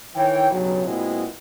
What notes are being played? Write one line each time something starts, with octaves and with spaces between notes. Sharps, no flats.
D#3 E3 E4 C#5 G5
B1 G2 C#3 F#3
A#2 G#3 B3 C4 E4 F#4